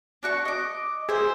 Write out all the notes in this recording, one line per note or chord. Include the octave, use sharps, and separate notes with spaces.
D4 F#4 C#6
D#5 D6
G#4 C5 E5